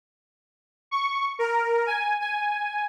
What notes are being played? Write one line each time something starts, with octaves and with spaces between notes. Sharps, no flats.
C#6
A#4
G#5
G#5